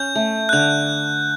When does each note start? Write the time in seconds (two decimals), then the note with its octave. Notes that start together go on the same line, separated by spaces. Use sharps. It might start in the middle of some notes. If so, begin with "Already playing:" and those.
Already playing: C#4 G6
0.15 A3
0.49 F#6
0.53 D3 G6